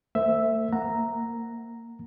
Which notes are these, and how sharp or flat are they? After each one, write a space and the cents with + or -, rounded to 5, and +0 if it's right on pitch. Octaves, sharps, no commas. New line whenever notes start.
A3 +45 C5 -10 E5 +0
A#3 -15 F#5 +0 A#5 +0